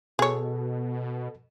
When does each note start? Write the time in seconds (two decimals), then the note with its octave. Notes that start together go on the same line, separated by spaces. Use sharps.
0.19 B2 G#4 A4 C#5